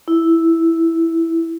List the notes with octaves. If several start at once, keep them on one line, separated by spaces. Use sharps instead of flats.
E4